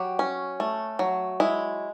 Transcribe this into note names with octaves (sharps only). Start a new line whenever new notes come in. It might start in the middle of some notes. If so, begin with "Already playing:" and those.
Already playing: F#3 G4
C#4
A3
F#3
G#3 E4